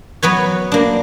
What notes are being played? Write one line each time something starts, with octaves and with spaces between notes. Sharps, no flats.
F#3 B3 B4 C#5
A#3 D4